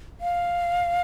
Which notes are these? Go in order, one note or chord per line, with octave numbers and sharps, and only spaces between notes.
F5